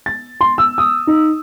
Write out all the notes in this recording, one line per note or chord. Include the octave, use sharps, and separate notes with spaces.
A6
C6
E6
D#6
D#4